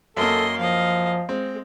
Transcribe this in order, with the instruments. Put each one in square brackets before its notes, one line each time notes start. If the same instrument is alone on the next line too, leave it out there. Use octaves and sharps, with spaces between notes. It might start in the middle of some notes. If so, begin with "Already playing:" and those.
[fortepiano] F#2 A#3 [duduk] A4 [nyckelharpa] D#5 C6
[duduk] F3 [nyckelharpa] D#5 F5
[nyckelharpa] G#3 [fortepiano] C4